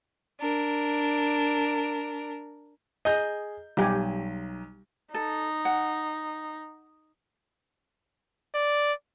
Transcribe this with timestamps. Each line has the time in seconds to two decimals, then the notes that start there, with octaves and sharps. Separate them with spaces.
0.40 D4 A#4
3.05 G#4 D#5 G6
3.77 B1 G3 G4 G#5
5.14 D#4 A4
5.65 F#5
8.55 D5